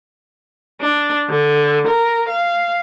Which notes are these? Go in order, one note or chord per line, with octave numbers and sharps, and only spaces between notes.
D4
D3
A#4
F5